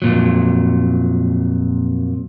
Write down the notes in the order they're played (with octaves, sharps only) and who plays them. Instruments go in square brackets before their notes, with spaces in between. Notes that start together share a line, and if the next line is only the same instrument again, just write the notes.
[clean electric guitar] F2 A#2 F#3